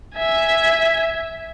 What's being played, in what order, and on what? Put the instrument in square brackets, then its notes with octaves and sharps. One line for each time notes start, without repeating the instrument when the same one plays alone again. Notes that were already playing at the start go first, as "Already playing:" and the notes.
[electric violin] E5 G#5